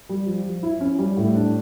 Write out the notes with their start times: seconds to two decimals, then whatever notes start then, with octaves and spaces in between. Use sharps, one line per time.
0.09 G3
0.26 F3
0.44 F3
0.63 E4
0.80 C#4
0.99 G3
1.17 A2
1.35 D4